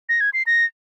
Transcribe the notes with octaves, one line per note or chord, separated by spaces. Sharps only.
A#6
G#6
C7
A#6